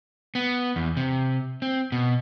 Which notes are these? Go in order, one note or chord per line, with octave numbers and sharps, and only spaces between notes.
B3
E2
C3
C4
B2